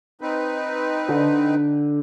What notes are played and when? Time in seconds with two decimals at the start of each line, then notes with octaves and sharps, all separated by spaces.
0.21 C4 D#4 B4
1.08 D3